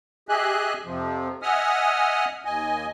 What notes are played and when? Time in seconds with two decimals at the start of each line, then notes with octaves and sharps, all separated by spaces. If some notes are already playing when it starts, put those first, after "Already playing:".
0.29 G4 G#4 D#5 E5 G#5 F#6
0.85 F2 C3 F3
1.42 D#5 E5 F#5 G#5 D#6 F6
2.45 D#2 D#5 G#5